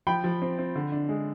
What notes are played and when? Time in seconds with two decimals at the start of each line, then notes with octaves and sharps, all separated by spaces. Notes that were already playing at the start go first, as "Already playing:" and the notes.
0.07 F3 G5 B5
0.24 F3
0.42 C4
0.59 C4
0.76 D3
0.92 D4
1.09 G#3